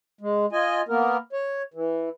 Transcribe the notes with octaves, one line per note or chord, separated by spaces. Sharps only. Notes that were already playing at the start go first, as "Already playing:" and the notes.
G#3
F4 D#5 G#5
A#3 B3 A#4
C#5
E3